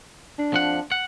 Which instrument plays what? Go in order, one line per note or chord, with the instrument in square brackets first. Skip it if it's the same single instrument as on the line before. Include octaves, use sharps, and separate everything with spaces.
[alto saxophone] D4
[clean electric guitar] F2 F3 F#5
F#5